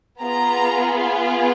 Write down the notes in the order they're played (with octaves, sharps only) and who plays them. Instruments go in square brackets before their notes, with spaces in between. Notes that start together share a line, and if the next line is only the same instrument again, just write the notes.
[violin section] B3 F4 G#4 A#5